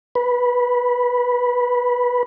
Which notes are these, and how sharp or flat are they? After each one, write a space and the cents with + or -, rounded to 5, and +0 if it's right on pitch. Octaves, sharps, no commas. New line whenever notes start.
B4 -10